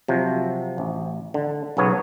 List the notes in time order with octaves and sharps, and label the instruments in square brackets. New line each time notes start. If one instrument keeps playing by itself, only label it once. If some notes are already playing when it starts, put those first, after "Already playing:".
[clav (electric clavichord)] C3 F3 F#3
A1
D3
B1 C#3 B3 C#5